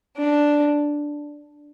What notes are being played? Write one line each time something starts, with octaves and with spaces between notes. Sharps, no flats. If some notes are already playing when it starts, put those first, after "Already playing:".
D4